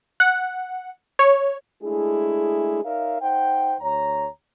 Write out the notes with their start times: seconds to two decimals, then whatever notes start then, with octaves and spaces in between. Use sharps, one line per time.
0.20 F#5
1.19 C#5
1.82 G#3 A3 D4 E4 G#4
2.84 D#4 A#4 C#5 E5 F5
3.21 D#4 C5 F#5 G5
3.81 D2 C#5 A#5